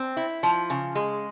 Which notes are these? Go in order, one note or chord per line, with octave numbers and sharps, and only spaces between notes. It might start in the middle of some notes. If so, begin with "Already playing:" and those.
Already playing: C4
E4
F3
C#3
G#3